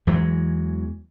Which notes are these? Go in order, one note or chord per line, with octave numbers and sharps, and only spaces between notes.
E2 E3 F#3 G#3